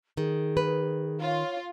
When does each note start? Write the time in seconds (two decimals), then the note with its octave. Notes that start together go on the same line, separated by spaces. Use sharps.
0.17 D#3 G#4
0.57 B4
1.23 F4 C#5